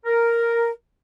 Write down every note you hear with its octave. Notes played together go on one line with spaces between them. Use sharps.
A#4